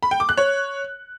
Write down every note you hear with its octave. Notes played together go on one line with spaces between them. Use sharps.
B5
G5
D6
F#6
C#5